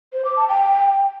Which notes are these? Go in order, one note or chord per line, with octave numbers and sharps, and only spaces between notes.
C5
D6
A5
G5